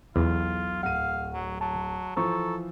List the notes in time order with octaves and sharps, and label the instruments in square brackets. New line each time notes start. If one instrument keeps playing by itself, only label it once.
[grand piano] B1 [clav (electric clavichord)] E2 [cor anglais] F4
[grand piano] D1 D#7 [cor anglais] F5 [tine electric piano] F#5
[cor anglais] F#3
[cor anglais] F#3 [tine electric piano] A5
[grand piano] E3 F3 C5 [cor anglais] A4 [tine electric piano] A#5 C#6